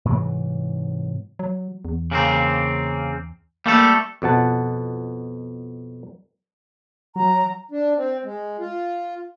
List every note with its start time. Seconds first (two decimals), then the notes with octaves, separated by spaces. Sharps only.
0.05 G#2 C3 E3 F#3
1.39 F#3
1.85 E2
2.11 C#3 A#3 C4
3.66 G3 A3 A#3 A4
4.22 F2 B2 F#5 A5
7.16 F#3 A#5
7.71 D4
7.97 C4
8.24 G#3
8.59 F4